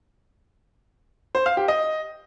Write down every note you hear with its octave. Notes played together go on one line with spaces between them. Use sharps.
C5
F5
G4
D#5